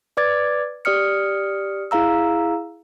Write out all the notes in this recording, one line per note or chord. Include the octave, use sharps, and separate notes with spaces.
B4 D5 D6 G#6 A6
G4 D5 D#6 F6 C#7
E4 G#4 F5 A#5 E6